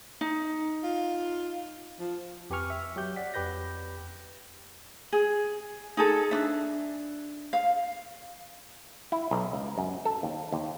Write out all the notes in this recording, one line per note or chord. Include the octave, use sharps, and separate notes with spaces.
D#4
F4
F3
F2 G4 B4 G#5 C#6 F6
E5
F#3 G4 G6
C#5 D5 F#5 B6
F2 G4 B4 G6 A#6
G#4
D#4 G#4 A4
D4 E5
F5
E4
B1
C#2
F#2
A4
D#2
D#2